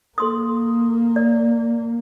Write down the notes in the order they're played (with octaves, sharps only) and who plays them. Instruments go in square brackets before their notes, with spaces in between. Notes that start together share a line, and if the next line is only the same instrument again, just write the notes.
[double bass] A#3 [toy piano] A4 C6 D#6
[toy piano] D5